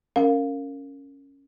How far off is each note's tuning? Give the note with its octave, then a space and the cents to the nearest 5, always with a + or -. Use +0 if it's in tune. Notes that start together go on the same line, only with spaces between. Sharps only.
C#4 +0 A#4 -20 F5 +0